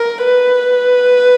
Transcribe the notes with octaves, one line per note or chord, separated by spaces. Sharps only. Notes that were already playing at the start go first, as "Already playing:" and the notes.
Already playing: A#4
B4